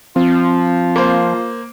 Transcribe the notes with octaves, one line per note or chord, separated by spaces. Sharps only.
F3 C4 F4
A#3 C5